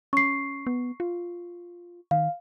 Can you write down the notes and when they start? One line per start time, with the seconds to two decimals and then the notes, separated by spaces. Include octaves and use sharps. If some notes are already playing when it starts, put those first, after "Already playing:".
0.13 C#4 C#6 C7
0.67 B3
1.00 F4
2.11 D#3 F5